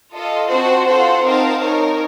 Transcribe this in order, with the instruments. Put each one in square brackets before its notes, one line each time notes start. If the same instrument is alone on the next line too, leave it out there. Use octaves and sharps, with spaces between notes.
[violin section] F4 A4 D#5
C4 F#4 C5 F#5 A5
F4 A4 C5 F#5
C4 D#4 A#4 F5 A5
D#4 A#4 C#5